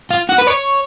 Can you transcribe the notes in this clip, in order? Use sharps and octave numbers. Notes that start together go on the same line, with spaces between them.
F4
F#4
B4
C#5